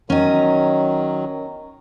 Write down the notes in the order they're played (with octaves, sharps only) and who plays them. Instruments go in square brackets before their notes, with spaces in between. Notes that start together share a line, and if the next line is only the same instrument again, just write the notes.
[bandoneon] D#3 F#3 [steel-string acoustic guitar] C#4 D#5